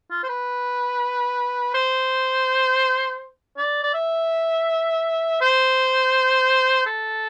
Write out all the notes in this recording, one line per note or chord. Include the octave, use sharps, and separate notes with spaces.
F4
C5
B4
C5
D5
D5
E5
C5
A4